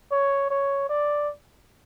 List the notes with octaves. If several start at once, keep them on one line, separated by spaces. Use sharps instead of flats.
C#5
C#5
D5